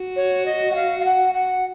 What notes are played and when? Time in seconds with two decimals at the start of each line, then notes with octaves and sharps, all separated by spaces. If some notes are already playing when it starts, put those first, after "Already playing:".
Already playing: F#4
0.16 C#5
0.45 D#5
0.70 F#5
0.75 F5
0.99 F5
1.05 F#5
1.34 F#5